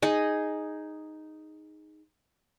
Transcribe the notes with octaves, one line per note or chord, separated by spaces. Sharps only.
D#4 G#4 D#5